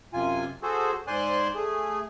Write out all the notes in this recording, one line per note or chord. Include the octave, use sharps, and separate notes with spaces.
F#2 C3 F4 G#5
F#4 G#4 A4 C5
G#2 C5 D5 G#5 C6 F#6
A3 G#4